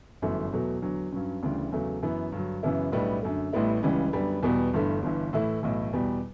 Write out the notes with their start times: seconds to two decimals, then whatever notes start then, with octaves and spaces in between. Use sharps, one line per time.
0.22 G1 F#2 E3 A3
0.52 E2 B2 F#3 A3
0.82 E2 D3 F#3
1.12 G2 F#3 C#4
1.43 D2 C#3 E3 G3 D4
1.72 E2 C#3 F#3 A3
2.03 F#2 E3 B3 E4
2.32 G2 D3 F#3
2.63 F#2 C#3 E3 B3 E4
2.92 B1 A2 G3 B3 D4
3.22 F#2 D3 A3
3.53 A1 A2 G3 B3 E4
3.83 C#2 C#3 E3 G3 C#4
4.13 F#2 D3 G3 B3
4.43 E2 B2 G3
4.73 G1 G2 E3 A3
5.02 G1 G2 E3
5.33 A2 E3 A3 E4
5.63 B1 A2 E3
5.93 E2 B2 G3